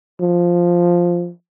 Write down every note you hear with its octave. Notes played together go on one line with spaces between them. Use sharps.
F3